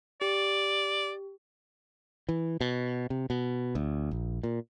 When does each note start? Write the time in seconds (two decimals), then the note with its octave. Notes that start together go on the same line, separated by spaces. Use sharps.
0.21 G4 D5
2.29 E3
2.61 B2
3.10 C3
3.30 B2
3.75 D2
4.11 A#1
4.43 A#2